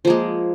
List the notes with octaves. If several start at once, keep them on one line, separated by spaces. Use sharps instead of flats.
F3 G#3 A#3